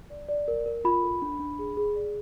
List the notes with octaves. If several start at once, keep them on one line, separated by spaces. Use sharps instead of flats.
D5
D5
A#4
A#4
F4 B5
A4
D4
D4
G#4
G#4
D5